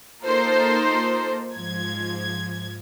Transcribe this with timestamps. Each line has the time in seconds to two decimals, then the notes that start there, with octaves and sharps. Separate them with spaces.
0.25 A#3 D#4 F4 A4 A#4 C5
1.56 G#2 F3 G#6